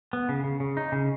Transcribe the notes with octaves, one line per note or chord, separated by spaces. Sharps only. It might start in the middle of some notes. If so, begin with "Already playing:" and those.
B3
C#3
C#3
C#3
D#4
C#3